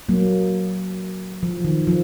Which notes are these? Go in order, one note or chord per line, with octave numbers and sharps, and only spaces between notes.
F#3 A#3
F3
D#3
F3